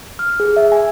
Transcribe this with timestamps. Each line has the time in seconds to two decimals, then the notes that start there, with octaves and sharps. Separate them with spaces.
0.19 F6
0.40 G#4
0.57 E5
0.72 G#5